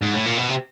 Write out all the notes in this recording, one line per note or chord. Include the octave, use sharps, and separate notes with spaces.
G#2
A2
A#2
B2
C3